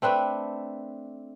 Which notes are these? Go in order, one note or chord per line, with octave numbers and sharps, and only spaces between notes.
A3 C4 D4 B4